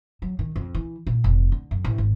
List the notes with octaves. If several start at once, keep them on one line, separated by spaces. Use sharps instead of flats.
F#3
D#3
F2
E3
A#2
F1
D3
F#2
A1
G#1